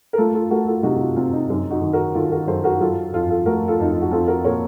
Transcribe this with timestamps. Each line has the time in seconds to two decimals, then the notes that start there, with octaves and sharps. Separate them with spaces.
0.13 A#4
0.17 A3 F4 A4
0.35 F4 A4
0.50 A3 F#4 A#4
0.67 F4 A4
0.83 C3 D#4 F#4
0.95 F#4
1.01 F4
1.16 C4 F4
1.33 D#4
1.49 F#2 D#4
1.71 D#4 F#4
1.81 D#3
1.93 F#4 A#4
2.14 D#3 F4 A4
2.31 F#4 A#4
2.47 F#2 A4 C5
2.64 F#4 A#4
2.80 F#3 F4 A4
3.13 F2 F4 A4
3.29 F4 A4
3.46 A3 F#4 A#4
3.68 F4 A4
3.80 F2 D#4
3.92 F4
4.02 F#4
4.12 C4 F4 A4
4.28 F#4 A#4
4.44 A#2 A#4 C#5